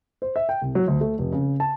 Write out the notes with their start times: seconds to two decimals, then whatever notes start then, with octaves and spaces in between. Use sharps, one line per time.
0.22 C5
0.36 E5
0.49 G5
0.62 C2
0.75 F#3
0.87 D2
1.01 A3
1.19 F1
1.32 C#3
1.60 A5